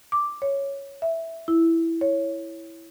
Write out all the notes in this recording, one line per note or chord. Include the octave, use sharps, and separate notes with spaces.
D6
C#5
E5
E4
C#5